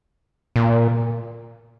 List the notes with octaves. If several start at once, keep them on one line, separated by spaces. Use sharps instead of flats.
A#2